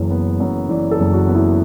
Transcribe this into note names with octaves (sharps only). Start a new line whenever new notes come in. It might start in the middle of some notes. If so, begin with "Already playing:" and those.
Already playing: F#1 F#2 E3 B4
B3
F#2
E3 D5
A4
F#1
F#4
B3
E4